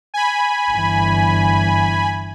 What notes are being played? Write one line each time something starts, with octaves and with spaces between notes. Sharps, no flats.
G#5 B5
G1 E3